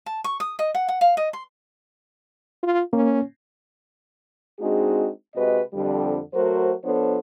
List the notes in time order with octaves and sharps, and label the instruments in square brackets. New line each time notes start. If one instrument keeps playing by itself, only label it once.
[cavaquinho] A5
C#6
D#6
D#5
F#5
F#5
F5
D#5
C6
[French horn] F4
[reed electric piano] A#3 [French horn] C#4
[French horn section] G#3 C4 D4 D#4 F#4 G#4
C3 G#3 F#4 B4 D#5
F2 D3 G3
F#3 A3 F#4 A#4 C5
F3 B3 D4 A4 C5 C#5